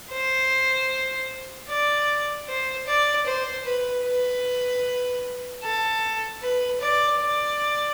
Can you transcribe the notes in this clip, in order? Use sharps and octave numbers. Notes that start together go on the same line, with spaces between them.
C5
D5
C5
D5
C5
B4
B4
A4
B4
D5
D5